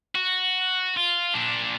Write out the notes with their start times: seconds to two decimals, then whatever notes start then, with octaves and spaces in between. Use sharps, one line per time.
0.15 F#4
0.96 F4
1.34 A#2 D4